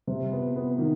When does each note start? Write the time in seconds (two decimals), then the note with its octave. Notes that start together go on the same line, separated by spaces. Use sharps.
0.07 C3
0.31 B3
0.55 B3
0.78 D#3